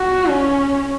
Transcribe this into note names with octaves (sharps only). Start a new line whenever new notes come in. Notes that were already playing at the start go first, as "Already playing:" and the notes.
Already playing: F#4
C#4